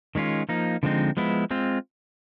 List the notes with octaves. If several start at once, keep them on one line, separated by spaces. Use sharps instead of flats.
D#3 G#3 C#4 F4
F3 A#3 D#4
D3 F3 G#3 C4 D#4
F3 G#3 B3 E4
G#3 C4 F4